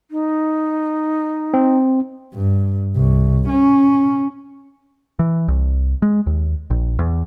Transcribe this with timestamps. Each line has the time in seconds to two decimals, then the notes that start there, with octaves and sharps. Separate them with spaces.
0.11 D#4
1.54 C4
2.34 G2
2.95 C2
3.48 C#4
5.19 E3
5.48 C2
6.02 G#3
6.27 D#2
6.70 A#1
6.99 E2